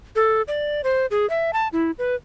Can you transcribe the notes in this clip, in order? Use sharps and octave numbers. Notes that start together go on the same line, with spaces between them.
A4
D5
C5
G#4
E5
A5
E4
B4